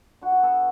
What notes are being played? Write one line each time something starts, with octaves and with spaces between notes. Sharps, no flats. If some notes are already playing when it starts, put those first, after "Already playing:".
D3 F#4
F#4
B3 A4